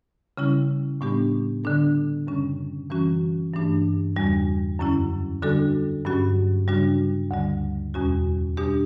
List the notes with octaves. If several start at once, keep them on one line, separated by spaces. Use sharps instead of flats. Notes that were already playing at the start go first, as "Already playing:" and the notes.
C#3 G3 C#4 E4
A2 G3 B3 D4 G4
D3 G3 D4 A4
F#2 C#3 G3 C#4
F#2 E3 G3 C#4 F#4
G2 E3 A3 D4 G4
E2 C#3 G3 D4 F#4
F#2 D3 F#3 C#4 E4
D3 G3 D4 F#4 A4
G2 F#3 C#4 F#4
C#3 G3 D4 F#4
D2 D3 G3
E2 B2 G3 C#4 F#4
B2 G3 D4 G4